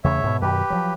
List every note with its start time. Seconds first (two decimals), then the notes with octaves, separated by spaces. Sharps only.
0.04 E2 C#3 A3 C#5 E5
0.23 G#2 B2
0.42 F#2 B2 D#3 G4 B4
0.70 F3 F#3